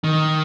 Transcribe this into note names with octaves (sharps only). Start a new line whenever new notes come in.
D#3